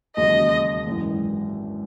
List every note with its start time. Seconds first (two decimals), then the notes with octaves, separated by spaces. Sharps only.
0.16 E1 D#2 C#3 F#3 D#5
0.87 G#1 F#2 E3